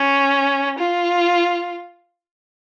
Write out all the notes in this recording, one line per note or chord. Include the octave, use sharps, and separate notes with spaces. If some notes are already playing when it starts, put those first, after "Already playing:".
Already playing: C#4
F4